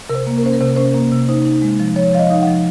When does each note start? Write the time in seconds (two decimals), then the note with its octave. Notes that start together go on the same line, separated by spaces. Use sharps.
0.09 C3 A#4
0.15 C5
0.27 A#3
0.38 A#4
0.43 C#4 C5
0.53 A#4
0.60 C3 C5
0.69 A#4
0.76 C#4 C5
0.84 A#4
0.94 A#3
1.11 C3
1.29 D#4 C5
1.45 D#4
1.62 G#3
1.80 F3
1.96 F3 C#5
2.13 F3 F5
2.19 D#5
2.30 D#4 F5
2.42 F#5
2.47 F3